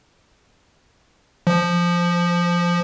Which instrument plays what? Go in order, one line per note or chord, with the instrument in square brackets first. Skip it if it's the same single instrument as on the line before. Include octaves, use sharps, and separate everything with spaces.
[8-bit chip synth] F3